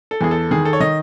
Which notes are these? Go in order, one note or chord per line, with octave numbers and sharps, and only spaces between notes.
A4
E2 G#4
A4
D#3 G#4
A4
C#5
D#3 D#5